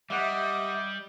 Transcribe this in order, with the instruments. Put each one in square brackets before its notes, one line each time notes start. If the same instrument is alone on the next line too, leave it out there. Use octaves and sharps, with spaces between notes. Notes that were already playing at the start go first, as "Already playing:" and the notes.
[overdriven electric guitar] G3 [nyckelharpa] G4 D#5 [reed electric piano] E5 F#5 [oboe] D6